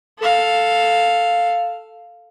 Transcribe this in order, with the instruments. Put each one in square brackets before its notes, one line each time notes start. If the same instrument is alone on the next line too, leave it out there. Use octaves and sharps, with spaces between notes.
[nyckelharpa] A4 F5